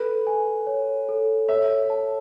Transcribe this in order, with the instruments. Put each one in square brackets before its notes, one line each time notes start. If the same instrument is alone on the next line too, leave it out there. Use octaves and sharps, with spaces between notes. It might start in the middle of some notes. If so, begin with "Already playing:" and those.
Already playing: [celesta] A4 [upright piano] B4
[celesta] G#5
C#5
A4
[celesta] C#5 [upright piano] E5
[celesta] A5